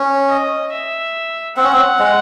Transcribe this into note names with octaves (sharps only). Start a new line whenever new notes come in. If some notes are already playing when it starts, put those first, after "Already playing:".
Already playing: C#4
D#5
E5
C4 F#5
C#4
C4
G#3